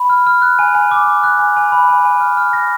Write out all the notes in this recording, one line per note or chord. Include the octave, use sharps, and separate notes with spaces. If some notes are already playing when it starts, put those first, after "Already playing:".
Already playing: B5
F6
F6
F#6
G#5
G#5
D6
D6
F#6
G#5
G#5
B5
G#5
G#5
F6
F6
A#6